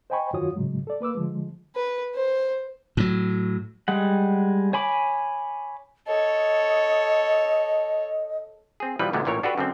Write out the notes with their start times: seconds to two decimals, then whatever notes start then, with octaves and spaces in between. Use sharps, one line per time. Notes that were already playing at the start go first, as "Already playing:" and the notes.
0.10 C5 D#5 G5 G#5 B5 C#6
0.33 F#2 D#3 F4 F#4 C#5 D#6
0.56 A2 C#3 F#3 G#3
0.87 A4 D5
1.01 A#3 B4 D6 E6
1.15 D3 F3 G#3
1.75 B4
2.15 C5
2.97 A2 F#3
3.88 G3 G#3 F#5
4.73 C#5 G#5 B5 D6
6.07 A4 C#5 D#5
8.80 C4 G#4
8.99 B2 E3 F3 G3 B4
9.13 D2 A#2 D3 G3 G#3 B3
9.25 A1 A#2 E3 A#4 C#5
9.43 D4 F#4 G4 A4 B4
9.58 F#2 D3 C4